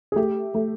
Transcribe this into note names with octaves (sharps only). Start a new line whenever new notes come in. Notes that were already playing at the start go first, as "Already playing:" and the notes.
G#4
A3 G4
A3